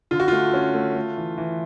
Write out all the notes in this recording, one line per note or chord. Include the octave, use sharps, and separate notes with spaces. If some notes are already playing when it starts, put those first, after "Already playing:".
D3 F4
F#4
A3 F4
C#4
A3
A3
E3
E3